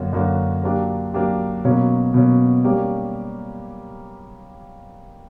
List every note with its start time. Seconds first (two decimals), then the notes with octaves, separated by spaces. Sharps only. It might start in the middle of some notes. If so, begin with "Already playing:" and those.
Already playing: F#2 D3 A#3 C#4 F#4
0.13 F#2 D3 A#3 C#4 F#4
0.63 F#3 A#3 D4 G4
1.14 F#3 A#3 D4 G4
1.65 B2 F#3 A#3 C#4
2.14 B2 F#3 A#3 C#4
2.64 G3 A#3 C#4 G4